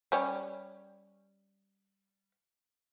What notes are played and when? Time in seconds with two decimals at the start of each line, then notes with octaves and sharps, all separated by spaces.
0.12 G3 C#4